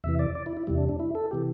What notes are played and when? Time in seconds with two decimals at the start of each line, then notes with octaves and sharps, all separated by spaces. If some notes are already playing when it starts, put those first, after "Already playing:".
0.04 E2 C3 E3 E5
0.19 D5
0.35 D5
0.46 E4
0.57 E4
0.67 E2 C3 G3 E4
0.78 D4
0.89 D4
0.99 E4
1.15 A4
1.31 C3 E3 G4